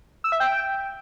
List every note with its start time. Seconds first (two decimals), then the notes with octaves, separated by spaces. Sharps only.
0.24 E6
0.32 E5
0.40 G5